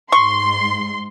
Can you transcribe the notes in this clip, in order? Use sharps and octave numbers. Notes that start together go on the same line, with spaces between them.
G#2 C6 C#6